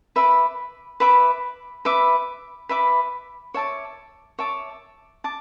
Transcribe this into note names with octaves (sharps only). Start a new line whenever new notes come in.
B4 E5 B5 D6
B4 E5 B5 D6
B4 E5 B5 D6
B4 E5 B5 D6
C#5 E5 A5 D6
C#5 E5 A5 D6
A5 D6